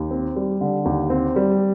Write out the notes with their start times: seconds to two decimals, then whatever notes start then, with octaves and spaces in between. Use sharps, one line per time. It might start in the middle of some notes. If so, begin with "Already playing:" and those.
Already playing: D#2
0.11 C4
0.36 G3
0.61 D3
0.85 D#2
1.10 C4
1.36 G3